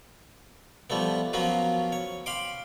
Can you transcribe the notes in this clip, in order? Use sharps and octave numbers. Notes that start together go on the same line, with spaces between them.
F3 G3 A3 B3
F3 F#3 A#3 B3 C#4 F4
C#5
F5 G5 B5 C6 D6